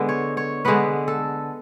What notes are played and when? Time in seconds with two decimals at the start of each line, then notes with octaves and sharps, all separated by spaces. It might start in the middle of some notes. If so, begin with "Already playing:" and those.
Already playing: D3 G#3 B3
0.09 C#5
0.37 C#5
0.65 D3 G#3 B3 B4
1.08 A4